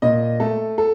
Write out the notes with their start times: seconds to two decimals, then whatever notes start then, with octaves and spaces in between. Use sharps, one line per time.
0.02 A#2 D#5
0.40 A3 A4
0.78 A4